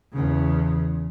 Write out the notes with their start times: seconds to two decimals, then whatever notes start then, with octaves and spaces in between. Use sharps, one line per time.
0.13 E2 C#3